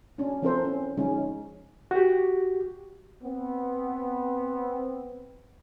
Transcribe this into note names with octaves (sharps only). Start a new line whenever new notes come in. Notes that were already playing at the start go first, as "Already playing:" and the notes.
C#4 D4
F3 C4 E4 A4 A#4 C5
C#4
D3 F3 G#3 C#4 D#4
F#4 G4
B3 C4